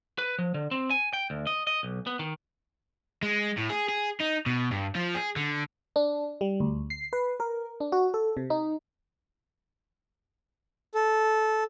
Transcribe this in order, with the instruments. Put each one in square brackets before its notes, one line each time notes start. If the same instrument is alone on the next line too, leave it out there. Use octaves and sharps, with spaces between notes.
[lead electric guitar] B4
F3
D3
C4
G#5
G5
D2
D#5
D#5
B1
B3
D#3
[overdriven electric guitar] G#3
A2
G#4
G#4
D#4
B2
G2
F3
G#4
D3
[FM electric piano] D4
G3
D2
C7
B4
A#4
D4
F#4
A4
C3
D#4
[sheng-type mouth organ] A4